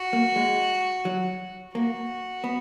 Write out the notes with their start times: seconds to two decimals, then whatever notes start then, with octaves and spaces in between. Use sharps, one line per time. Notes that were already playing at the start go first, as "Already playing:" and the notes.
Already playing: F#4
0.13 A#3
0.36 G#3
1.05 F#3
1.75 A#3 F#4
2.44 B3